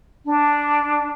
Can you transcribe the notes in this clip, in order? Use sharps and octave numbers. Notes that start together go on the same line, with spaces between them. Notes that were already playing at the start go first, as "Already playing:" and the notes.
D4